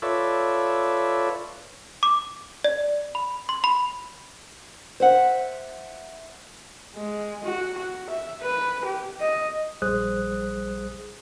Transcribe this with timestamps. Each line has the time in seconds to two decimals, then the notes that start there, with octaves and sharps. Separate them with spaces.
0.02 F4 A4 B4 C#5 D5 E5
2.03 D6
2.64 D5
3.15 B5
3.49 C6
3.64 B5
5.00 C5 E5 F#5
6.96 G#3
7.44 F#4
7.77 F#4
8.10 E5
8.42 B4
8.85 G4
9.20 D#5
9.82 A#1 G3 G#4 C5 D#6 F#6